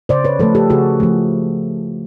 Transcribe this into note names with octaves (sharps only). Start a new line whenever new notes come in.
C#3 C5 D5
B4 C#5
F3 A3 A4 B4
G4 A4
C#3 F#4 G#4
F3 A3